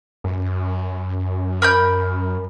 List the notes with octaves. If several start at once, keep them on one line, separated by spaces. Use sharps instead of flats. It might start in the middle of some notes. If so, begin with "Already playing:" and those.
F#2
A#4 B5 G6